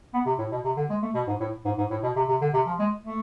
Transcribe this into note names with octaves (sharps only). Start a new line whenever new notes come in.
B3
C3
A2
B2
C3
D3
G#3
A3
B2
G#2
A2
G#2
G#2
A2
B2
C3
C3
D3
C3
F3
G#3
A3